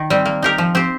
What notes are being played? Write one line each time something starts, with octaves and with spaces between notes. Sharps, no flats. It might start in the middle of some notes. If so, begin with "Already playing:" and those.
Already playing: D#3
G3 C4
A#3
D#4 G4 A#4
F3
C4 G4 C5